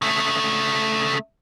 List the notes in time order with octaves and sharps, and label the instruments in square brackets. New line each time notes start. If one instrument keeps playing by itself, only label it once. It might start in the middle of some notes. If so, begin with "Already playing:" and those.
[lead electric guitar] C#3 A3